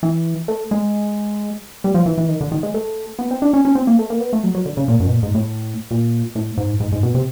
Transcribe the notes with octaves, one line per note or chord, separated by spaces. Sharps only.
E3
A3
G#3
G3
F3
E3
E3
D#3
D3
D#3
G#3
A3
B3
C4
D4
C#4
C#4
C4
A#3
A3
A#3
B3
A3
F#3
F#3
D3
C#3
A#2
F#2
B2
A#2
G#2
A2
A#2
A2
G#2
G#2
G#2
B2
C3